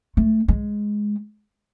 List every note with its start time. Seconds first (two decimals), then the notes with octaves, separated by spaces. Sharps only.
0.17 A3
0.48 G#3